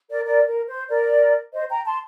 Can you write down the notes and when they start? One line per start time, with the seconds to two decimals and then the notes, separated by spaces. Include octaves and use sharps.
0.10 A#4 D5
0.25 A#4 D5
0.47 A#4
0.68 C5
0.89 A#4 D5
1.53 C5 D#5
1.69 G5 A#5
1.85 A5 C6